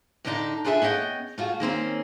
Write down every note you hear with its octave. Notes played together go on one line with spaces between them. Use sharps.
A2 D3 B3 D4 D#4 A4
D4 F4 G#4 A4 E5 A5
B3 C#4 D#5 F#5 G5
A3 F4 F#4 G#4
D#3 A#3 C4 C#4